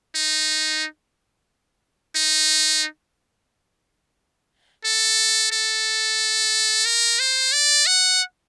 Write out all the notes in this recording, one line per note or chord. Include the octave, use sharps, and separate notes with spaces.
D#4
D#4
A4
A4
A#4
C5
D5
F#5